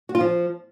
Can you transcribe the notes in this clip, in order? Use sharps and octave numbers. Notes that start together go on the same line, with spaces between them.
F#4
F4
F3